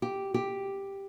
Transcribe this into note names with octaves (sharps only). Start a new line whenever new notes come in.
G4
G4